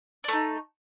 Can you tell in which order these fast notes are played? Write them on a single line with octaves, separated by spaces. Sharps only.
D4 A3 D#4